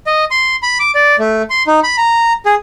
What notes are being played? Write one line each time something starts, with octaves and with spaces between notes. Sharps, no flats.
D#5
C6
B5
D6
D5
A3
C6
D#4
B5
A#5
G#4